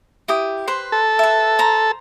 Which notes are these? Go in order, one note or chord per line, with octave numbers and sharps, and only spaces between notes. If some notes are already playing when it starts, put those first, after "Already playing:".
E4 G4 D#6
B4 C5 C6
A4
B4 E5
C5 A#5